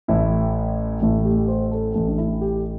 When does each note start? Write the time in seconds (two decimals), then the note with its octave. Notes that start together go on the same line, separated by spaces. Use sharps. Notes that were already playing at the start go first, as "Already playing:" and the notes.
0.08 A1 A2 A3 E4
1.01 A1 A2 A3 E4
1.25 G4
1.48 C5
1.71 A4
1.94 A1 A2 A3 A4
2.07 D4
2.18 E4
2.41 G4